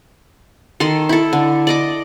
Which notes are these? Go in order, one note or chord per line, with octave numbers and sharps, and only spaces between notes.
D#3 A4 C6
E4 A4
D3
D5 D#5 D6